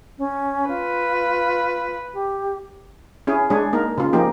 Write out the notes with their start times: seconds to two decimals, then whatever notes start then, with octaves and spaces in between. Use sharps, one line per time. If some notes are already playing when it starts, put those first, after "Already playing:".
0.18 C#4
0.68 F4 B4
2.14 G4
3.27 C#4 E4 G#4
3.50 G#3 D4 G#4 C#5
3.73 A#3 D#4 A#4
3.98 C#3 F4
4.13 F3 A#3 D#4 G4